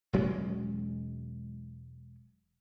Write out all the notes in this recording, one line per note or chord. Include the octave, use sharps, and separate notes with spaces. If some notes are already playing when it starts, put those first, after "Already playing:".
E1 F#3 G#3 C#4